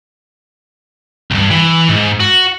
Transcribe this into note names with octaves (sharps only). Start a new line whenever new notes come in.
C2 G2
E3
G#2
F#4